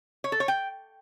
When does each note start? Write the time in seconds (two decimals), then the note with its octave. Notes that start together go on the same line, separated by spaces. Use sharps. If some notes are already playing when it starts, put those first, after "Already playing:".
0.24 C#5
0.32 A4
0.40 C#5
0.48 G5